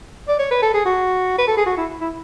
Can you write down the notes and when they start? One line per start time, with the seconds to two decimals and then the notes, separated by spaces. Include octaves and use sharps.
0.28 D5
0.39 C#5
0.51 B4
0.62 A4
0.74 G#4
0.85 F#4
1.38 B4
1.47 A4
1.57 G#4
1.66 F#4
1.77 E4
2.01 E4